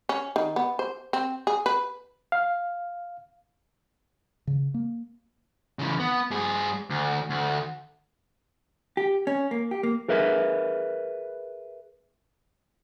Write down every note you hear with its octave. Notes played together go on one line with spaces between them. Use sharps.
C#4
D#3
B3
C5
C4
G#4
B4
F5
C#3
A#3
C#3 E3
B3
G2 G#4
D2
D2
G4
C#4
A#3
G4
A#3
G#4 A#4 B4 E5